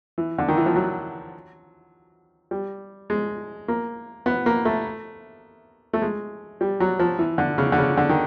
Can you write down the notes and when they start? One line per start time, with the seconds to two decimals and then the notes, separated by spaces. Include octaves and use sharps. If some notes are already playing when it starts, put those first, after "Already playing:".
0.18 E3
0.38 D3
0.48 D#3
0.57 E3
0.66 F3
0.76 F#3
2.51 G3
3.10 G#3
3.68 A#3
4.26 B3
4.46 A#3
4.65 A3
5.93 A3
6.02 G#3
6.61 G3
6.80 F#3
6.99 F3
7.19 E3
7.38 D3
7.58 C#3
7.72 D3
7.78 C#3
7.97 D3
8.09 D#3